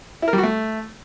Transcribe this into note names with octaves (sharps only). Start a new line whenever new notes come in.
E4
A#4
G3
F#4
A3